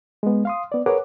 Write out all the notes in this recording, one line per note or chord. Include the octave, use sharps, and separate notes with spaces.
G#3 B3
F5 C6 D#6
B3 D5
G#4 A#4 B4 C#5 F#5 D6